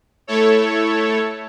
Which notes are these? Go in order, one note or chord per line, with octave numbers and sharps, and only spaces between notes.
A3 E4 A4 C#5